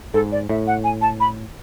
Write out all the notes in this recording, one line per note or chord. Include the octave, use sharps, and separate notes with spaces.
G#2 A4
D5
A2 E5
F#5
G#5
A5
B5